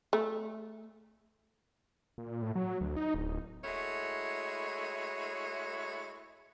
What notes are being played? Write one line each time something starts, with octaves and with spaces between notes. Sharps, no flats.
A3
A#2
A2
F#3
D2
D#4
D1
G#3 A3 E4 F#4 C#5